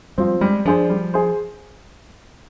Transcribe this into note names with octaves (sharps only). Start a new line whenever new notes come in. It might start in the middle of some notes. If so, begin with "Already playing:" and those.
F3 G3 C4
G3 G#3
F3 D4 G#4 C5
G3
G#4 C5